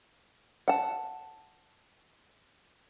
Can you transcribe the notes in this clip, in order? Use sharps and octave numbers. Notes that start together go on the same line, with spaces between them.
F#5 A5